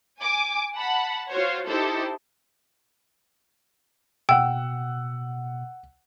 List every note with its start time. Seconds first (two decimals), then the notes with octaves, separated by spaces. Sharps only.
0.21 G#5 D6
0.76 F#5 A5 B5
1.29 F4 F#4 C5 C#5
1.68 D#4 E4 G4 A4 C5
4.29 B2 F#5 G5 E6